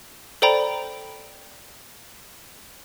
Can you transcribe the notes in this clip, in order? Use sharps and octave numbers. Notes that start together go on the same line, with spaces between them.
A4 C5 D5 G5 A#5 B5